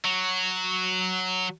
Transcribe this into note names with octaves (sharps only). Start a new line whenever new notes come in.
F#3